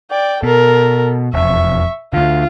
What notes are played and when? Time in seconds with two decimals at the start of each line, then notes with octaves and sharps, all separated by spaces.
0.11 D5 G5
0.43 B2 A4 A#4
1.34 E1 F2 E5 C#6
2.13 D2 D3 F4